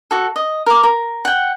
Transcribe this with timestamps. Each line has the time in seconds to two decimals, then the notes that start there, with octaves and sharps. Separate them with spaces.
0.11 F#4 A4
0.36 D#5
0.66 A#4 D6
0.83 A#4
1.25 F#5 G5